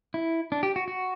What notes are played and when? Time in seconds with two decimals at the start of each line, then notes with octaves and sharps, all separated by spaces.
0.14 E4
0.52 D4
0.63 G4
0.76 F#4
0.88 F#4